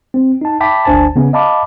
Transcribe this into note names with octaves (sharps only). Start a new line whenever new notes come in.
C4
D#4 A5
E5 G5 A5 B5 D6 B6
G1 D2 D4 C5 G#5 A5
C#3 B3 C#4
D#5 F5 A5 B5 D6